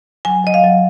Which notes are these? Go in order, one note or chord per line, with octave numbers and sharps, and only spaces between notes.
F#3 G#5
F#3 D#5
F5
F#3